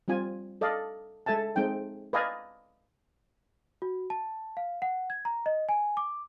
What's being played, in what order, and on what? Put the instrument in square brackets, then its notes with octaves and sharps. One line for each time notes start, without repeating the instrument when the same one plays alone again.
[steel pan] G3 C4 F4 G#5
A4 D5 D#5 F5
G#3 A4 E5 G#5 A5
G#3 C4 D#4 G5
B4 D5 D#5 F5 G#5 A#5
[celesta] F#4
A5
F5
F#5
G#6
A#5
D#5
G#5
D6